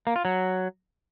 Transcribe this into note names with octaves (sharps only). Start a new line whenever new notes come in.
A#3
F4
F#3